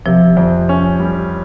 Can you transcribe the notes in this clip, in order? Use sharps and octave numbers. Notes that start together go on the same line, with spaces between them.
C3 F3
F2
C#4
G3